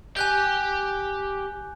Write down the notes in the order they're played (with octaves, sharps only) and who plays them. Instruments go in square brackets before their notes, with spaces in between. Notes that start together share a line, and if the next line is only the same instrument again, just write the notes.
[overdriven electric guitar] G4 G5 [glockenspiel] G#5 F#6 G6